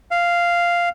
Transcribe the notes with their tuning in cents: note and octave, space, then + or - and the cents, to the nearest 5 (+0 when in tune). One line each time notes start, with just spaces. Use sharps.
F5 -5